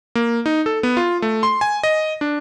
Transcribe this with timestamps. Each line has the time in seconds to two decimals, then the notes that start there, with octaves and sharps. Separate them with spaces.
0.15 A#3
0.46 D#4
0.66 A4
0.83 B3
0.97 F4
1.22 A3
1.43 C6
1.61 G#5
1.83 D#5
2.21 D4